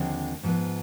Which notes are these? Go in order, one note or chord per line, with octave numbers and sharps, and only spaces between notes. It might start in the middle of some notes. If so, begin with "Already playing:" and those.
Already playing: D#2 D3 F3 G#3 C4
G#2 F3 G#3 B3